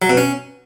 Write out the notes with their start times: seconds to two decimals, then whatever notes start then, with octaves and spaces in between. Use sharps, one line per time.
0.02 F#3
0.10 B2
0.17 C#4